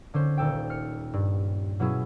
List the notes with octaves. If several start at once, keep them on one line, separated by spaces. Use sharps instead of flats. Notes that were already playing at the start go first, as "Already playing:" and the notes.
D3 C#4 C5
D#1 A4 G5
F6 C#7
G2
B2 F#3 C#4 E4 G#4